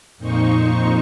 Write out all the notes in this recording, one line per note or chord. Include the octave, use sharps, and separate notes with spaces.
F2 A#2 D#4 C5 C#6